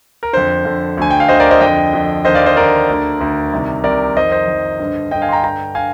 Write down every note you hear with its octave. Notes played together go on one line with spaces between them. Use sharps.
A#4
F2 D3 C5
F2 D3
D2 D3 G#5
G5
F5
D2 D3 C5 D#5
A#4 D5
C5 D#5
F2 D3 D#5 G5
F2 D3
D#2 D3 C5 D#5
D5 F5
C5 D#5
D#2 D3 A#4 D5
D2 D3
D2 D3
C2 C3 D#3
C2 C3 D#3 A#4 D5
F2 D#3 C5 D#5
C5 D#5
F2 D#3
G2 D3
G2 D3 D#5 G5
F5 G#5
C6
G5 A#5
G2 D3 G5 A#5
D3 F5 G#5